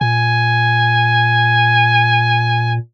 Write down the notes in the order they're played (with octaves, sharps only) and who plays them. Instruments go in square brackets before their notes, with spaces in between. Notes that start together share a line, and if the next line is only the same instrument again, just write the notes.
[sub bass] A#2 [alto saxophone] G#5